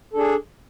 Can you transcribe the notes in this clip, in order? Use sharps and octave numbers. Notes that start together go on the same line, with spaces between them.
D4 G#4 A4